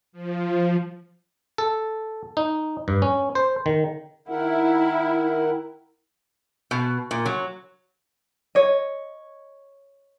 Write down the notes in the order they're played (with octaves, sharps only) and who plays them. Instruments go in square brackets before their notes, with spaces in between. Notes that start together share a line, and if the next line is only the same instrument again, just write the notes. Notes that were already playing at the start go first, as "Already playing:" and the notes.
[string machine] F3
[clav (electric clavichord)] A4
D#4
G2
C#4
C5
D#3
[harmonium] D#3 A#4 F#5 [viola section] E4
[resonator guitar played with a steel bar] B2
A#2
F#3
[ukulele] C#5 D#5